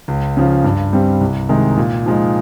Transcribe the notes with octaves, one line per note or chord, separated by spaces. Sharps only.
C#2
C#3 F3
G2
G3 C4
C2
C3 D#3 G#3 D#4
A#2
F3 G#3 D#4